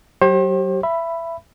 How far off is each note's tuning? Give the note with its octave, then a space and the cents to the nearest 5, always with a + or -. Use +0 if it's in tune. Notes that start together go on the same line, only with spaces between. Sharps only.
F#3 +25 G4 -20 C5 +40
E5 +20 B5 +0